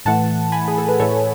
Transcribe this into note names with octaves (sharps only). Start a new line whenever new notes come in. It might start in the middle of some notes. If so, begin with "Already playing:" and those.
A2 E3 A3 F#5 A5
G#5 B5
G#4
A4
B4
A2 E3 A3 A4 C#5